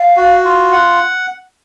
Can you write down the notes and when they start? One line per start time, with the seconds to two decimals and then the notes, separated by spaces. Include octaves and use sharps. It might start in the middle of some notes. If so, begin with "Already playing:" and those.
Already playing: F5
0.17 F#4
0.45 F4
0.72 F#5